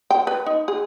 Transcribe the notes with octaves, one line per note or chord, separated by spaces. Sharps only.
G5
B4
D#4
G#4